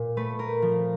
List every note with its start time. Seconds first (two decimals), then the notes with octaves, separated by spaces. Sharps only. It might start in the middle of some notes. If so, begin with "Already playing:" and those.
Already playing: A#2
0.17 A3 B4
0.39 A#4
0.62 F3